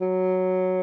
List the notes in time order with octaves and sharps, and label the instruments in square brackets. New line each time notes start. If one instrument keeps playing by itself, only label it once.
[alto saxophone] F#3